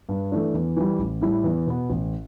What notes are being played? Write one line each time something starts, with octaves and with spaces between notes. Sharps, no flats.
G2
E3 A3 D4
E2
E3 G3
A1
A2 G3 E4
E2
B2 B3
A1